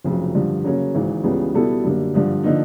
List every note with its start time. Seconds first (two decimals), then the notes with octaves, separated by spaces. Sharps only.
0.04 F1 F2 C#3 F#3
0.35 G2 D3 F3
0.64 C#3 F#3 A#3 C#4
0.94 G#1 G#2 E3
1.24 C#2 C#3 E3 G3 B3
1.54 B2 G3 B3 E4 A4
1.84 F#2 D3 G3 A#3
2.14 G2 D3 F3
2.44 D3 F3 A#3 D#4